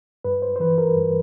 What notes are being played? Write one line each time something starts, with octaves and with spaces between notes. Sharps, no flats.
G2 B4
C5
C5
E3 B4
A#4
G2